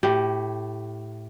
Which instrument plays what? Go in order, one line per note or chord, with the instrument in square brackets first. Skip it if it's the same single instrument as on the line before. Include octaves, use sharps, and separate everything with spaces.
[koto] A2 [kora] G4